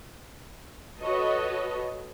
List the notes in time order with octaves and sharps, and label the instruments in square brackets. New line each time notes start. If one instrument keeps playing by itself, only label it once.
[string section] F#4 A4 B4 C#5 D#5